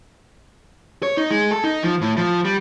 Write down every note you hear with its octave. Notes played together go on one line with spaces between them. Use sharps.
C#5
D#4
G#3
A4
D#4
F3
A2
F3
G3